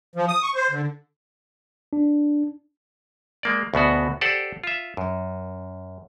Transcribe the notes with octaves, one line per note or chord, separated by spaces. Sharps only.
F3
D#6
C#6
C5
D3
D4
G#3 A#3 D5
D2 B2 B3 F#4
G4 A4 C5 D5 F#5
F4 E5
F#2